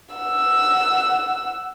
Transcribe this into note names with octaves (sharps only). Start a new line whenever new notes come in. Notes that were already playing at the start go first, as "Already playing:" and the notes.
F#5 E6